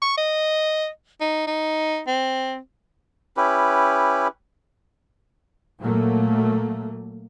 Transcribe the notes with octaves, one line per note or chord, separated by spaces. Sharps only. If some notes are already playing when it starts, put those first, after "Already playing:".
C#6
D#5
D#4
D#4
C4
C#4 E4 G4 B4
A#2 F#3 A3 A#3